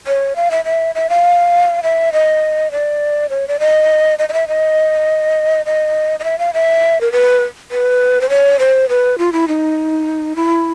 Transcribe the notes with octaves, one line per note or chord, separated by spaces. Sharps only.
C#5
F5
E5
E5
E5
F5
E5
D#5
D5
C#5
D5
D#5
D#5
D#5
E5
D#5
D#5
D#5
E5
F5
E5
A#4
B4
B4
C5
C#5
C5
B4
F4
E4
D#4
E4